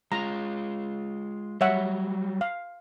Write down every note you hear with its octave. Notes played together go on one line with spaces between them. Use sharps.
G#3 F4 A#5
F#3 G3 C#5 E5 F#5
F5